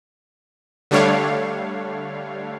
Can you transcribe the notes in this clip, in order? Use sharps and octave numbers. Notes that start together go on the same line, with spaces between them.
D3 G3 A3 D4 C#5 F5